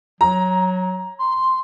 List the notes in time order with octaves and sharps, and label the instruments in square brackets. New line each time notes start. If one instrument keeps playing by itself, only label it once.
[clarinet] F#3 [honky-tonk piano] A#5
[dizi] C6